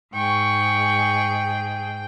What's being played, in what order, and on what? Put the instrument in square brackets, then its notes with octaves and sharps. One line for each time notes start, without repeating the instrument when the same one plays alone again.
[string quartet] G#2 G#4 [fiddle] G5 [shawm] C#6